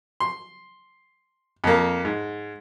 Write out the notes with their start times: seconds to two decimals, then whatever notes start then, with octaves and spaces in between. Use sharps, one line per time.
0.20 C6
1.64 F2 A#3
2.05 G#2